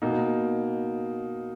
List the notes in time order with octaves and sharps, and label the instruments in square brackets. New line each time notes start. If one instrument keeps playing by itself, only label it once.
[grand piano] B2 A#3 D#4